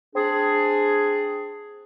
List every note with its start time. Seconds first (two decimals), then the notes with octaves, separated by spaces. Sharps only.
0.15 C4 D4 G#4